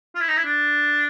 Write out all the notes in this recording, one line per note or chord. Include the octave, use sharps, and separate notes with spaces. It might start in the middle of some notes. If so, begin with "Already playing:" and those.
F4
E4
D#4
E4
D4